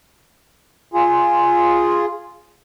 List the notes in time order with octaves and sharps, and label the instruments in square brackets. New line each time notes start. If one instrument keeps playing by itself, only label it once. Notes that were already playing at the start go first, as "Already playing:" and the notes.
[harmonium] F4 G#4